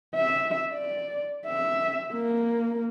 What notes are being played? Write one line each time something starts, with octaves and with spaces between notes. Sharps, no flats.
E5
D5
E5
A#3